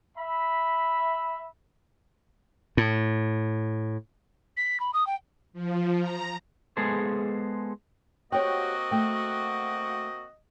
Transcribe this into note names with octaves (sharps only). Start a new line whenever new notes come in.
E5 B5
A2
B6
B5
D#6
G5
F3
A#5
G#3 B3 G#4 A4 C5
A#3 C4 F#4 G4 C#5 D#5 G5
A3 G5